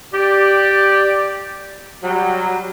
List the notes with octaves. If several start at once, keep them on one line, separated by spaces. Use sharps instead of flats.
G4 D5
F#3 G3